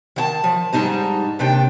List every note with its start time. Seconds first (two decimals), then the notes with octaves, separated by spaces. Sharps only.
0.16 D#3 F#5 A5
0.44 F3
0.73 G#2 G3 D#4 A5 A#5
1.39 D#2 C3 D4 G5